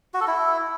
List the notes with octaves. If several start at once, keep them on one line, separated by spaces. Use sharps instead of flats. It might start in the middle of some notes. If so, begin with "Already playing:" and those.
F#4
A4
E4